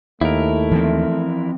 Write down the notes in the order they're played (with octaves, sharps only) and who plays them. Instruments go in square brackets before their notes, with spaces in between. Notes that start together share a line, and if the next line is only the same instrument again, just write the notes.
[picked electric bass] D#2 [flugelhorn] A3 [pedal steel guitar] E4 A#4
[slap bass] E3 F3 C4